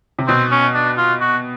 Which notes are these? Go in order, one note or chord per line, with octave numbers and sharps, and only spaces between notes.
C3
B2 C4
C#4
D4
F4
F#4